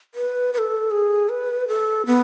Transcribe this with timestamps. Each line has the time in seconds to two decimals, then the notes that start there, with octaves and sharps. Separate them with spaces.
0.15 B4
0.53 B4
0.58 A4
0.91 G#4
1.29 B4
1.68 A4
2.06 B3